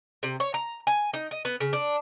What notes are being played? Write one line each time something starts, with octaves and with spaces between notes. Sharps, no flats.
C3
C#5
A#5
G#5
D#4
D#5
B3
C#3
D4